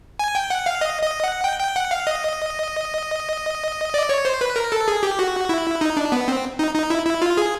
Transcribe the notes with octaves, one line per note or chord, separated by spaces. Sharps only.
G#5
G5
F#5
F5
D#5
D#5
F#5
G5
G5
F#5
F5
D#5
D5
C#5
C5
B4
A#4
A4
G#4
G4
F#4
E4
D#4
D4
B3
C4
D#4
D#4
E4
E4
F4
G#4